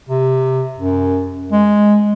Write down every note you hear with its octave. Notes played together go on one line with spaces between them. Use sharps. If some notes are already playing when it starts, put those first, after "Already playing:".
C3
F#2
G#3